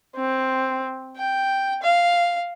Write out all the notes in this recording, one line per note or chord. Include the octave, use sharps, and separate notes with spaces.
C4
G5
F5